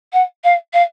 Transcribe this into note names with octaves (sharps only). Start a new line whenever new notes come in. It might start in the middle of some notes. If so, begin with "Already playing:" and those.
F#5
F5
F5